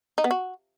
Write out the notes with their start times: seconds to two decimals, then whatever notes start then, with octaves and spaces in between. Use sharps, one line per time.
0.18 D#4
0.24 B3
0.31 F#4